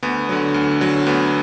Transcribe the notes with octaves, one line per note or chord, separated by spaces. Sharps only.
D2 B3
D3 F#3
D2
D3 F#3
D2 B3